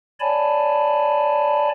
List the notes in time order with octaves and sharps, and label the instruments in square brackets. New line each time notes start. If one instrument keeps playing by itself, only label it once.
[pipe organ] C#5 D5 G#5 A5 B5